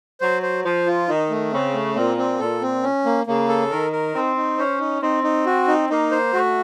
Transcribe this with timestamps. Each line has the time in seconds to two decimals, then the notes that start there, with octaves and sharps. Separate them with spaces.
0.21 F#3 C5
0.42 C5
0.64 F3 C5
0.86 F4
1.08 D#3 D#4
1.30 A3
1.51 C#3 C4
1.74 A3
1.95 A#2 C4
2.17 C4
2.39 A#2 A4
2.62 C4
2.83 C#4
3.05 A#3
3.27 C#3 A#3
3.49 A4
3.71 D#3 A#4
3.93 A#4
4.14 C4 D#4
4.36 D#4
4.58 C#4 C5
4.80 D#4
5.01 C4 D#4
5.24 D#4
5.46 F#4
5.67 D#4
5.89 A#3 D#4
6.11 C5
6.32 A3 F#4